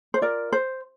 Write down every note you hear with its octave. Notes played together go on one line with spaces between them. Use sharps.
C5
F4 A#4 D5
C5